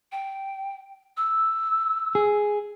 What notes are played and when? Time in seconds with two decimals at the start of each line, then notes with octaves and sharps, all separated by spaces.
0.12 G5
1.17 E6
2.15 G#4